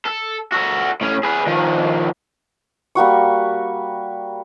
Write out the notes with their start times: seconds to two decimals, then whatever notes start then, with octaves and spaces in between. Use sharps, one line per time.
0.05 A4
0.52 F#4 A4
1.01 A2 C#4
1.23 G#4 B4
1.47 D#3 F3
2.95 G3 A#3 F#4 C#6